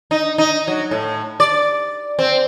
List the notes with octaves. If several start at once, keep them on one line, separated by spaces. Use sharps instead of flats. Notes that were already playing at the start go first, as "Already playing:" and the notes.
D#4
D#4
F#3
A2
D5
C4